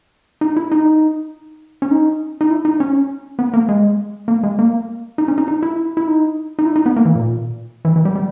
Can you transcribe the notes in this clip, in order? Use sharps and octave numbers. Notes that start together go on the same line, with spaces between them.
D#4
E4
D#4
C#4
D#4
D#4
E4
D#4
C#4
B3
A#3
G#3
A#3
G#3
A#3
D#4
C#4
D#4
D#4
E4
E4
D#4
D#4
E4
D#4
B3
A#3
E3
A#2
E3
E3
G3
G3